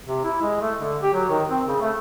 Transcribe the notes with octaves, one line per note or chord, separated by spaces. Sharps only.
C3
E4
G#3
A3
D3
G4
F#3
D#3
C4
C#3
A3